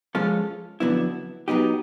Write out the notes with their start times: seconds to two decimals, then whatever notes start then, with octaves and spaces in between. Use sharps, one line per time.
0.15 F3 G#3 C#4 F4 A4
0.80 F2 D3 F#3 B3 E4
1.48 F#3 B3 D#4 G4